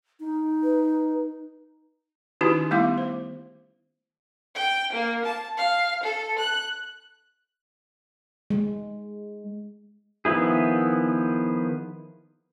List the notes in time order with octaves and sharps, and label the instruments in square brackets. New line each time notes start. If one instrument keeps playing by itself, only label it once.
[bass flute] D#4
[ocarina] B4
[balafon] D#3 C#4 D#4 E4 F#4 G4
G3 A3 B3 E4 F5 D6
C5
[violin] G5
A#3
A5
F5
A4
F#6
[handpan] G#3
[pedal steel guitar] D#3 F3 B3 E4 G#4